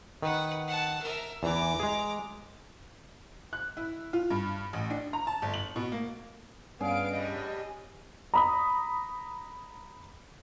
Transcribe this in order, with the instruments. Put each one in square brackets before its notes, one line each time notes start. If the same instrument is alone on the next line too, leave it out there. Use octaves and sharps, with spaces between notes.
[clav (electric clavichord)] D#3 [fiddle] B4 F#5
[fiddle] F#5 A5
A#4 E5
[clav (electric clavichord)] E2 E3 [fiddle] A#5 D6
[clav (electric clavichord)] G#3 G#4
[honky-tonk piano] F#6
E4
F4
G2
A1
D4
A#5
A5
G1
F#7
B2
A#3
[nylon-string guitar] G2 C#4 D4 [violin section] B3 F5 D7 [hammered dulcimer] G#4
[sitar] A2 G3 [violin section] D#5
[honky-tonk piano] A#5 B5 D#6